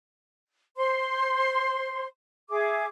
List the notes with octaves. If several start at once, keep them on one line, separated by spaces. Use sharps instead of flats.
C5 C6
G#4 E5 D6